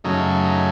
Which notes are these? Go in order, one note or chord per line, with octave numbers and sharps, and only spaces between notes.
F#2 C#3 F#3 A3 D#4
D#4